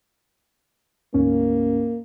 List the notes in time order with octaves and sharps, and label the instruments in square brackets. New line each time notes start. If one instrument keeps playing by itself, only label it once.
[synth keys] D2 G#2 C#4 [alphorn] A#3